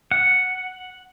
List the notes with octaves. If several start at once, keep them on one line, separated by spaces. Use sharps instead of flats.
F#5